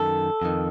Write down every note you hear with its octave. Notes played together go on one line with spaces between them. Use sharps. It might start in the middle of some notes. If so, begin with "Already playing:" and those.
Already playing: F#2 D#3 A4
F2 D#3